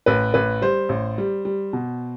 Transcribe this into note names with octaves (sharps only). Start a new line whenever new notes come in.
A1 B4
A1 B4
G3 C5
A1
G3
G3
B2